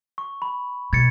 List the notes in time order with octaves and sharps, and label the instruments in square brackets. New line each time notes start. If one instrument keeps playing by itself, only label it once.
[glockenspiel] C#6
B5
[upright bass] B2 [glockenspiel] G#6 A6 C#7